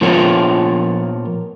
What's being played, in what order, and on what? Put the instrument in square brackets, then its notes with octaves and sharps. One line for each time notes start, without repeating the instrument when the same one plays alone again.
[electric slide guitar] A#2 F3 B3 F4 A#4 C#5